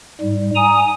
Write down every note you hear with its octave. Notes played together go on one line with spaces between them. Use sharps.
G#2 G3
G#5 A#5 D#6